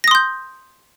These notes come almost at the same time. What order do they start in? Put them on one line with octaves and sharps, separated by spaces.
A#6 D#6 C6 G6